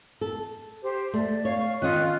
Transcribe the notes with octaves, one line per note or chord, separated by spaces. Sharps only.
A4
G4 C5
A3 D5
C#5 F5 C#6
D#3 C#4 F4 D#5 F#6